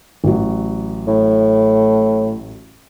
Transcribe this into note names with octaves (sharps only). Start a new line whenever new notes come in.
A1 F#3
A2